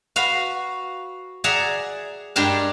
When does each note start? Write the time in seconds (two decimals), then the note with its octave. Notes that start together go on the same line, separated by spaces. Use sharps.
0.16 F#4 B4 F5
1.44 G#4 D5 E5 F#5 A#5
2.36 G2 G3 G#3 D4 G4 A#4